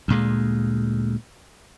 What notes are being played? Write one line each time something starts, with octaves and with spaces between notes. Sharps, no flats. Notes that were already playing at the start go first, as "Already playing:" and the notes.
D2 A#2 G#3